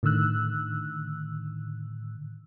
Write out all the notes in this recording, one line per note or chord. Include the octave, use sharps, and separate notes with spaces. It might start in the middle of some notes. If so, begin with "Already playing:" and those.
A2 D3 D#3 E6 F#6